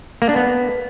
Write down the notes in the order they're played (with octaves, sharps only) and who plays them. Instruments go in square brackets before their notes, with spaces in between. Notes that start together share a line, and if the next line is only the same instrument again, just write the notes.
[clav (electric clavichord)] A#3
D4
B3